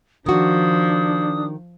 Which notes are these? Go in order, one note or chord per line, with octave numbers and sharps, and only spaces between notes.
D#3 F3 D4 F#4 D#6